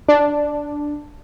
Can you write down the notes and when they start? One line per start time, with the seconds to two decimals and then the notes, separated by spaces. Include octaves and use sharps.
0.08 D4